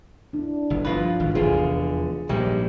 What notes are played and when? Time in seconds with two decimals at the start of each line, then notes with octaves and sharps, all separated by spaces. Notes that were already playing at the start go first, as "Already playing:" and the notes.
0.33 D4 E4
0.70 G1
0.85 G2 D#3 F3 F4 B4
1.20 G#1
1.35 F1 E2 D3 F4 G#4
2.29 A#1 G#2 G3